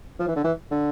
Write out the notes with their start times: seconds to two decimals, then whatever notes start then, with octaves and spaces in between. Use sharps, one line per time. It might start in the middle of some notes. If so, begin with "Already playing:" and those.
0.19 F3
0.28 E3
0.36 D3
0.44 E3
0.71 D3